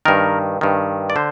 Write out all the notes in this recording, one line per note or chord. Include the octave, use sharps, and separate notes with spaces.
G2 D#3 A#4
G2 D#3
D5
D3 C5